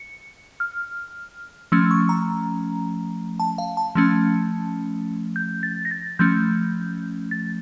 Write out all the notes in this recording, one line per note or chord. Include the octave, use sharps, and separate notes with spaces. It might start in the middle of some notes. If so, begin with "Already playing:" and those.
Already playing: C#7
F6
F3 A3 C#4 E6
C#6
A#5
A5
F5
A5
F3 A3 C#4
G6
A6
A#6
A6
F3 A3 C#4 G6
A6